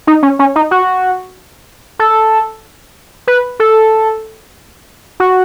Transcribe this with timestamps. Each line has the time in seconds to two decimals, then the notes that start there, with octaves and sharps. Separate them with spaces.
0.07 D#4
0.23 C#4
0.39 C#4
0.56 D#4
0.71 F#4
1.99 A4
3.27 B4
3.60 A4
5.20 F#4